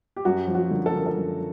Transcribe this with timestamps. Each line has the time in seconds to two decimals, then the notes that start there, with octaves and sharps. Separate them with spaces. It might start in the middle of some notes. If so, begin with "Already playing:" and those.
0.16 G4
0.25 F#2 F#4
0.47 F3
0.55 F#4
0.71 D3
0.86 A4
0.93 D3 A#4
1.06 A4
1.16 F#2